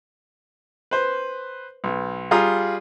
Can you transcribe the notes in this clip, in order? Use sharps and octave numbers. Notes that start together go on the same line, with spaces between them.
B4 C5
B1
G3 F4 G#4 A#5 D#6